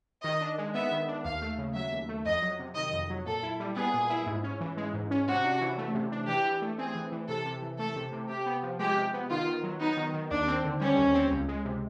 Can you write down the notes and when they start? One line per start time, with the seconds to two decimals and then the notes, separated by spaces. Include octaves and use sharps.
0.24 D#3 D#5
0.41 D4
0.58 G#3
0.75 B3 E5
0.91 D#3
1.08 D4
1.25 D#2 F5
1.42 A3
1.58 C#3
1.75 F#3 E5
1.92 D#2
2.09 A3
2.25 F2 D#5
2.42 F#3
2.59 C3
2.76 D#3 D#5
2.93 F2
3.10 F#3
3.26 A#2 A4
3.43 E4
3.60 G3
3.77 B3 G#4
3.94 A#2
4.10 E4
4.26 G#2
4.44 C#4
4.61 E3
4.77 G#3
4.94 G#2
5.11 C#4
5.27 C3 F#4
5.44 D4
5.61 E3
5.78 A3
5.94 C3
6.12 D4
6.28 E3 G4
6.45 E3
6.62 A3
6.78 C4 G#4
6.95 E3
7.12 E3
7.29 C3 A4
7.46 C3
7.62 E3
7.79 A3 A4
7.96 C3
8.13 C3
8.29 C3 G4
8.46 B3
8.63 F3
8.79 G#3 G4
8.97 C3
9.14 B3
9.30 D#3 F4
9.47 D#3
9.64 F#3
9.80 B3 D#4
9.97 D#3
10.14 D#3
10.31 D#2 D4
10.48 C4
10.64 D3
10.81 G3 C#4
10.98 D#2
11.15 C4
11.31 C#2
11.48 G#3
11.65 C3